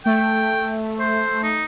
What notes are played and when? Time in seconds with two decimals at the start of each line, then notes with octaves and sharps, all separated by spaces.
0.06 A3 G5
1.00 C5
1.44 D#4